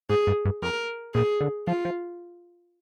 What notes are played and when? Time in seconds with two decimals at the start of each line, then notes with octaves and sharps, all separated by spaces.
0.09 G#2 G#4
0.27 G2
0.45 G2
0.62 F2 A#4
1.14 A#2 G#4
1.41 D3
1.67 F3 F4
1.85 F3